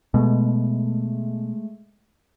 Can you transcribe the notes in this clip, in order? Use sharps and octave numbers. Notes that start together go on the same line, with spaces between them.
B2 G#3 A3